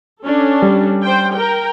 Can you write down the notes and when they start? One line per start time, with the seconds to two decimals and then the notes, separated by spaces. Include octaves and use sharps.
0.22 C#4 D4 A4
0.62 G3
1.04 C5 G5
1.35 A#4 G5